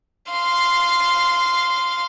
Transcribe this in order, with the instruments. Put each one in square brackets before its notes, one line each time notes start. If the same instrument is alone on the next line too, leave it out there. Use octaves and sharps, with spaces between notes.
[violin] F5 C6